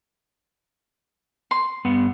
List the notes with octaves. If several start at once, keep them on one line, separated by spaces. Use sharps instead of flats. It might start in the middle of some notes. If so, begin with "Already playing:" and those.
C6
G2 B3 F#5